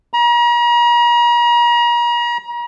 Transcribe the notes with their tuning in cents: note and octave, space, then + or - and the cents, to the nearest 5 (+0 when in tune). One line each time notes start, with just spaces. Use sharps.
A#5 +40